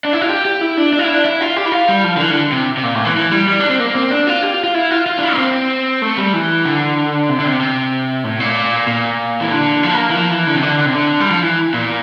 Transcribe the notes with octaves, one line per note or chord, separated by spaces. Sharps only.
D4
E4
F4
G4
G4
E4
D4
D4
F4
E4
D4
E4
F4
G4
E4
F4
G3
F3
D3
E3
D3
C3
C3
A#2
A2
E3
E3
G3
G3
D4
C4
A#3
C4
D4
F4
G4
F4
F4
E4
F4
F4
D4
E4
A#3
C4
A3
G3
E3
D3
C3
D3
C3
C3
A2
A#2
A#2
E3
D3
F3
A#3
E3
F3
E3
D3
C3
D3
D3
C3
D3
G3
F3
E3
A#2